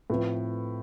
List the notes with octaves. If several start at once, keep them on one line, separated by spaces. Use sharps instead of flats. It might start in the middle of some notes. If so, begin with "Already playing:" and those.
A2 F3 C4 F4 B4